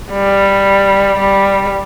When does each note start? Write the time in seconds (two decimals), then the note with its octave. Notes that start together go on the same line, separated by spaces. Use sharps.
0.12 G3
1.19 G3